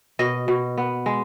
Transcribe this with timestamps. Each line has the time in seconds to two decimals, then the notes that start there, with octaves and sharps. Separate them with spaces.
0.19 B2 D#5
0.48 B2
0.78 B3
1.06 G#3